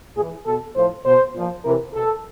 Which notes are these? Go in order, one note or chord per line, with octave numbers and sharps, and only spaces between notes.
A2 G#4
E3
B2 A4
A2 F3 C5
B2 C5
A#2 F3
C3 E3 A#4
B2 A4